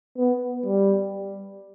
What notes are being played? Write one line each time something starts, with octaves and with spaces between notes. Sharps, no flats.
B3
G3